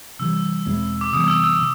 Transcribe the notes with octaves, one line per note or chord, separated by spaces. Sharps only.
C3 E3 G3 E6
E2 B2 G#3 C4
D6
C3 E3 G3 B3 D#6
E6
E6
C3